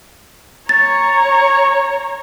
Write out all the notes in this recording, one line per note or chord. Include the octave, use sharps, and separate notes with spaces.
C#5 A#5 A6